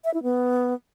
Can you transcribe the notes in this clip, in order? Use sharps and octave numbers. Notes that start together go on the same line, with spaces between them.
E5
E4
B3